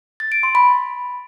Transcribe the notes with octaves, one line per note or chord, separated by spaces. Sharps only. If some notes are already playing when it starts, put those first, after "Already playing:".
A6
D7
C6
B5